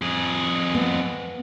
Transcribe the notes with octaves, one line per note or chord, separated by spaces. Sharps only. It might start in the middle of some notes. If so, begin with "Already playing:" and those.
F2 G#4
B3